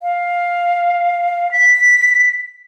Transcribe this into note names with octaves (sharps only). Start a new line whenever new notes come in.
F5
B6